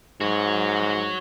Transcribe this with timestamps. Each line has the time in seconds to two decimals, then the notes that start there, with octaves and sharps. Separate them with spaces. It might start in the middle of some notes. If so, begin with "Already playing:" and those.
0.21 G#2 F#4 C#5